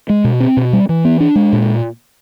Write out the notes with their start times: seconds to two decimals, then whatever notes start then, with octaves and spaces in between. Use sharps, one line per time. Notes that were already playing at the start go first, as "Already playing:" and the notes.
0.09 G#3
0.24 B2
0.40 C4
0.57 B2
0.73 G3
0.89 E3
1.05 B3
1.20 D4
1.35 G#3
1.53 A#2